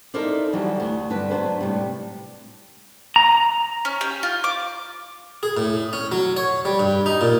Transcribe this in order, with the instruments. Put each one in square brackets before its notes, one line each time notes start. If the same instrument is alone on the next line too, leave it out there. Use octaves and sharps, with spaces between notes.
[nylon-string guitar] D#4 E4 A4 A#4 C5 D5
D3 E3 F#3 G3 B3
D2
G2 D3 A4 B4
F#3 B3 D4 B4 C5
A2 C3 G3
[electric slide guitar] A#5
[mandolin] C#4
G4
F4
D6
[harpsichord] G#4
A2
C#4
F#3
C#5
G3
G2
D#4
A#2